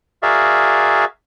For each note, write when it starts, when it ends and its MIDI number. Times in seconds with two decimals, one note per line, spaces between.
0.23 1.05 66
0.23 1.05 68
0.23 1.05 70
0.23 1.05 74
0.23 1.05 76
0.23 1.05 77